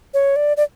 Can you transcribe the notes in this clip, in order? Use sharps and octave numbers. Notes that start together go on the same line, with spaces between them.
C#5
D5
D5